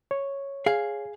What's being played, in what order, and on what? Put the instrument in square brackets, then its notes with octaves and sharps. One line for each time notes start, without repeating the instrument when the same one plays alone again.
[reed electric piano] C#5
[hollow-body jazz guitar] G#4 F5